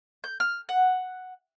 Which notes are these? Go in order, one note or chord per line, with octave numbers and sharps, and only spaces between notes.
G6
F6
F#5